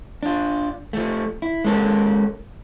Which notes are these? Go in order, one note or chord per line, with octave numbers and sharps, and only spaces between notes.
D4 F4
F3 A3
E4
G#3 C#4 A4 A#4